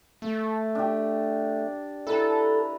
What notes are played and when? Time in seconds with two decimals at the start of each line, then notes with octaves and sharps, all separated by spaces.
0.22 A3
0.75 D4 G4
2.07 E4 A4 B4 A#5